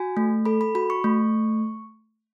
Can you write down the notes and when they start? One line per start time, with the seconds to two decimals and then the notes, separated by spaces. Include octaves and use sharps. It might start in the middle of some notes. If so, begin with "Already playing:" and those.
Already playing: F#4 G#5
0.17 A3
0.46 A4 B5
0.61 B5
0.75 F#4 B5
0.90 C#6
1.04 A3